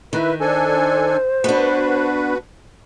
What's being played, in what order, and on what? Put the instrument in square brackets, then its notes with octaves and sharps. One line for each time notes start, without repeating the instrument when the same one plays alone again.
[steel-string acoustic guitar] D#3 [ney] E4 [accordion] B4
[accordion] D4 A4 G#5 [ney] C5
[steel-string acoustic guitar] B3 D4 [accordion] F#4 B4